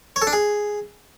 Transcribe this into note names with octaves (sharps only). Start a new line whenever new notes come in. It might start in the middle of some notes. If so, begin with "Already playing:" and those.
C#5
A4
D4
G#4